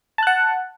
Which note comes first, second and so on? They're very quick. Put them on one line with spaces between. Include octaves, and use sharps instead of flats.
A5 F#6 F#5